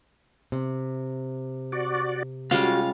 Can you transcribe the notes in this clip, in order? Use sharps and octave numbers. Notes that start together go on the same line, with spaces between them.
C3
F#4 D5
G3 G#3 C#4 F4 F#4 F5